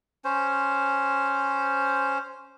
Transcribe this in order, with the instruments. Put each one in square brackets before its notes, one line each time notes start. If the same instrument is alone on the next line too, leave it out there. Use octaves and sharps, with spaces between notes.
[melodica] C#4 C5